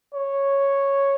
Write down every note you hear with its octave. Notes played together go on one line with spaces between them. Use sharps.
C#5